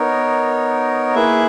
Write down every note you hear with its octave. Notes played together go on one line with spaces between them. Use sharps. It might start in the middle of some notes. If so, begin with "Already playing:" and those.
Already playing: B3 D#4 A#4 C#5
A#3 E4 G#4 B4 E5